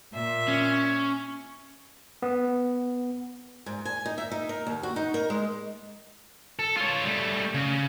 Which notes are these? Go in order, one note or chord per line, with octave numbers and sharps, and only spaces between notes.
A#2 E5
C#4
B3
G#2
G#5
D#4
E5
D#4
A#4
D#2
F#4
D#4
A#4
G#3
A4
F4 C#5
G3 A3
C#3